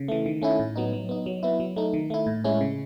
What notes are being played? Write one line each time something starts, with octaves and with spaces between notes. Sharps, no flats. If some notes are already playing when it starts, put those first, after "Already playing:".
Already playing: C#3
E3 A3
D#3
A3 C#4 E4
A2
F#3 B3 D#4
F#3
B3 D#4
F#3
B3 E4
F#3
A3 D#4
D#3
A3 E4
A2
G#3 C#4 E4
C#3